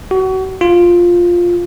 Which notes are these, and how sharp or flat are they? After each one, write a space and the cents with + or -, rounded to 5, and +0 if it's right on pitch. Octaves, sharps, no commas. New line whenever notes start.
F#4 +30
F4 +5